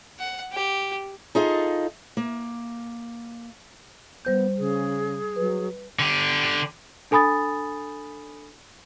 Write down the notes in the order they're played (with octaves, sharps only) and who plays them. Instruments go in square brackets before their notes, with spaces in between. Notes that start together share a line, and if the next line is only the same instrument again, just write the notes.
[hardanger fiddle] F#5
G4
[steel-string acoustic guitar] D#4 F4 G#4 A4 D#5 F5
A#3
[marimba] G3 C5 G6 [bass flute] B3
[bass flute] C#3 [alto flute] G#4
[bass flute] F#3 [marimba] B4
[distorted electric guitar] D3 G4
[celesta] D4 A4 G#5 B5 D#6 A6